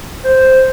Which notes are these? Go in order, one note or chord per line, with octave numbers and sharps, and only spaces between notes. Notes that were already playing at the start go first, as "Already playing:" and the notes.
C5